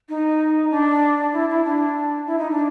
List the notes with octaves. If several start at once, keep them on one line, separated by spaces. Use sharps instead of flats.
D#4
D4
E4
E4
D4
E4
D#4
D4